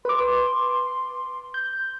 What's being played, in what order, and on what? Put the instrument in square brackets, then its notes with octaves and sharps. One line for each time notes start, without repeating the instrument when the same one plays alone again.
[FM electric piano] B4 D6 [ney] C6
[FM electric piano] G6